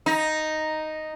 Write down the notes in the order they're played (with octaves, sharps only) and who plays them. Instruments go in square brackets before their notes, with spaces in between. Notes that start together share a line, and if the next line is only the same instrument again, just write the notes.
[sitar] D#4